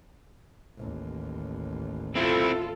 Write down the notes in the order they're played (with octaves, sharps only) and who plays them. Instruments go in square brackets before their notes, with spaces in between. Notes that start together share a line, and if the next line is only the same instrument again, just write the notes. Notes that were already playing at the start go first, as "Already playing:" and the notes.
[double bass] A1 D#2
[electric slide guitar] C4 E4 [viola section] F4 A4